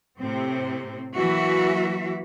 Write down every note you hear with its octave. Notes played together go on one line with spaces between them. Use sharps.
A2 C3 C4
E3 F#3 A#3 F#4 E5